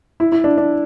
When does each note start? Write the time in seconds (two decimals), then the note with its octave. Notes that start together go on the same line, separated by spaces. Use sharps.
0.20 E4
0.32 E4
0.44 D4
0.58 D4